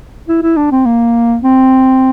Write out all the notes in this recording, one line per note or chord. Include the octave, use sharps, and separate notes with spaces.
E4
E4
D4
C4
A#3
C4